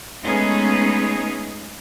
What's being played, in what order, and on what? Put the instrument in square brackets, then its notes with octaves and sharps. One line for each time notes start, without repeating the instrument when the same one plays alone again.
[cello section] G#3 A3 B3 C#4 D#4 G#4